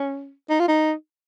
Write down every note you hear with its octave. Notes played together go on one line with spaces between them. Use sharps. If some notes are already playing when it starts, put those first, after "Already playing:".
Already playing: C#4
D#4
F4
D#4